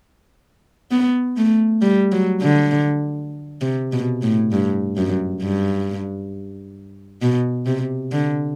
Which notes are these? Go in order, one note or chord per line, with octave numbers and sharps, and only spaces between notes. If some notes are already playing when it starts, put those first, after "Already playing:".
B3
A3
G3
F#3
D3
C3
B2
A2
G2
F#2
G2
B2
C3
D3